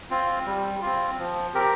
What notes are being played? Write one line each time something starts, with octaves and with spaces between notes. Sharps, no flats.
C4 F4
G3
C4 F4
F3
C4 G4 A#4